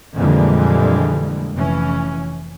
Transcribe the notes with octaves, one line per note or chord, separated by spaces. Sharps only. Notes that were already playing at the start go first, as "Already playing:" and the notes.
F2 A#2 D3 E3 G3 G#3
F1 E3 C#4